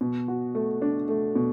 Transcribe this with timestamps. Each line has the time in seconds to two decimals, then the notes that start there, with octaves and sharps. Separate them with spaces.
0.01 B2
0.28 F#4
0.55 A3
0.82 D4
1.09 A3
1.35 B2